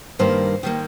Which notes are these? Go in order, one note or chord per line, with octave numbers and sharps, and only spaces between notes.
G2 D#3 G3 A#3 C5
D#3 G3 A#3